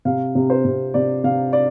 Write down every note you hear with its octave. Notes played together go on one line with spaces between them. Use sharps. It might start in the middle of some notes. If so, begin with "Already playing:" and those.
C3 F5
C3
C5
C3
C3 D5
C3 F5
D5